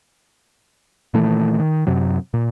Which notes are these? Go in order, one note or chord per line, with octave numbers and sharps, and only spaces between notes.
A#2 D#3 E3 A3
D#3
F#2 C3 F#3
A#2